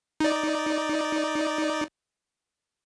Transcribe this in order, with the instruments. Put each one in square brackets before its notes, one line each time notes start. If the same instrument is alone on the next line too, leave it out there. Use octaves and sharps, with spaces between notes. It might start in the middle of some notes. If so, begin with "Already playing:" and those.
[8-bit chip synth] D#4 D5